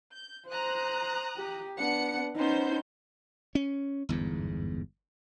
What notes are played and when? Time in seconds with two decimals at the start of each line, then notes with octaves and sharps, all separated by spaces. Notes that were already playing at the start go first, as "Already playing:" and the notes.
0.12 G6
0.49 C5 A#5 D#6 F#6
1.37 G4
1.78 B3 D4 F#5 C#7
2.36 B3 C#4 D#4 C5 G6
3.55 C#4
4.09 G1 E2 G#2